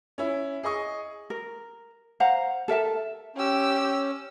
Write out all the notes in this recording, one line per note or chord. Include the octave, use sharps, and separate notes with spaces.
C#4 E4
G#4 D#5 C#6 D#6
A#4
C5 F5 F#5 A#5
A4 A#4 E5 A5
C#4 G4 E6